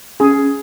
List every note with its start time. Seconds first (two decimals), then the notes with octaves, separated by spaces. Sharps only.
0.20 C#4 G#4